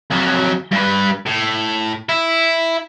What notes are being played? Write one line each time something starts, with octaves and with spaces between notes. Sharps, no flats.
F2 F#3
G2 B4
A2
E4